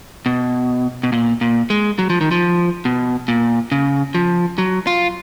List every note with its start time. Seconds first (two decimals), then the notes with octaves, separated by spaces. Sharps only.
0.26 B2
1.03 B2
1.12 A#2
1.41 A#2
1.70 G#3
1.99 F#3
2.10 F3
2.21 D#3
2.31 F3
2.85 B2
3.28 A#2
3.72 C#3
4.15 F3
4.58 F#3
4.87 F4